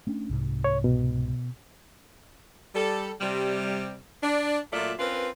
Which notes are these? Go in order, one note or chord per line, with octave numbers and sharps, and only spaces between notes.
A3 C#4 D4
C2 G#2 C3
C#5
B2
G3 A4
C3 G3
D4
A#2 F#3 A3 F4 D5 E5
C4 C#4 F4 A#4 B4